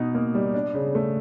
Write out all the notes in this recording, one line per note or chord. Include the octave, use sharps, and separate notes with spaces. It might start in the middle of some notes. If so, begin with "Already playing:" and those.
Already playing: B2 D#4
A#3
G3
D4
C#3
A3